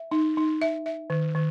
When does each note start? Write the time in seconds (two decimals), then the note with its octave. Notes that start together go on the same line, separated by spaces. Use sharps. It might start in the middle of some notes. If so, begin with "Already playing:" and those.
Already playing: E5
0.11 D#4
0.37 D#4
0.62 E5
0.86 E5
1.10 D#3
1.35 D#3